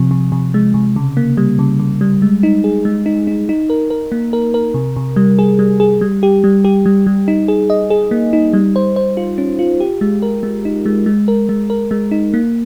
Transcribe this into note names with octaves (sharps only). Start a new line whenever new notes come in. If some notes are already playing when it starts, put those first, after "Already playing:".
Already playing: C3 F3
C3
C3
G#3
C3
C#3
A#3
G3
C#3
C#3
G3
G#3
D#4
G#4
G#3
D#4
D#4
D#4
A#4
A#4
A#3
A#4
A#4
C3
C3
G3
G#4
G3
G#4
G3
G4
G3
G4
G3
G3
D#4
G#4
D#5
G#4
A#3
D#4
G3
C5
C5
F4
C#4
F4
G4
G#3
A#4
G#3
D#4
G#3
G#3
A#4
G#3
A#4
G#3
D#4
A#3